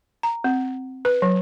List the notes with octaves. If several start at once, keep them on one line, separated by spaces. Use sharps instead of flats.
A#5
C4
B4
F#3